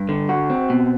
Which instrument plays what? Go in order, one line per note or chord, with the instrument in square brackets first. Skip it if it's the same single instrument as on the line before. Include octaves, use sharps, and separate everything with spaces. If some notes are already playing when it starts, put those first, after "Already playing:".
Already playing: [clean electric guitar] G2
D3
F#4
C4
B2